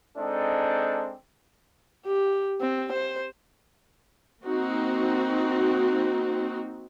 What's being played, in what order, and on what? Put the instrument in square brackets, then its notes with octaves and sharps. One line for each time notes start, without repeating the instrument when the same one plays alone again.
[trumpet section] G#3 C4 D4 D#4 A4
[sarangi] G4
C4
C5
[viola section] A#3 C4 D#4 F#4